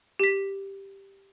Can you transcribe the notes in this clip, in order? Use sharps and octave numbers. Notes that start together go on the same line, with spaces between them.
G4 B6